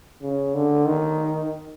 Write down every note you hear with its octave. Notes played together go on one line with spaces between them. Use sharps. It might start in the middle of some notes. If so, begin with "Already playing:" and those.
C#3
D3
D#3